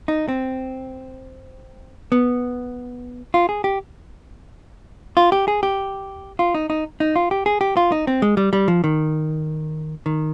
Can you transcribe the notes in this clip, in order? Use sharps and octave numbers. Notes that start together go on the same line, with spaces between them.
D#4
C4
B3
F4
G#4
G4
F4
G4
G#4
G4
F4
D#4
D#4
D#4
F4
G4
G#4
G4
F4
D#4
C4
G#3
G3
G3
F3
D#3
D#3